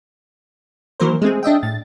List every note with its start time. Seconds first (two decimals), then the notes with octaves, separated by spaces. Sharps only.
1.00 D#3 E3 F#3 A#3 A#4 C5
1.22 G#3 A3 C4 G#4
1.43 D4 D#5 E5 G5
1.63 A2 A6